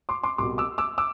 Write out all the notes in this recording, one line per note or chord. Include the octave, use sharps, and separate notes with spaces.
C6 D6
C6 D6
C2 B2 C6 D6
D6 E6
D6 E6
D6 E6